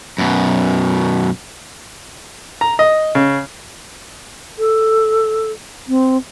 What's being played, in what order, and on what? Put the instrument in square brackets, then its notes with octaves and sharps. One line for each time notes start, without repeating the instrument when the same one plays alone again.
[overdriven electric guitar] F#2 B2
[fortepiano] A#5
D#5
C#3
[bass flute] A4
C4